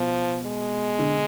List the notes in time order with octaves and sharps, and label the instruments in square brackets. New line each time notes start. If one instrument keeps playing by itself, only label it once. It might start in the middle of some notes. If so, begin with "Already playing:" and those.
Already playing: [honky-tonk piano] B2 [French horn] F3
[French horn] G#3
[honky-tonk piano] D3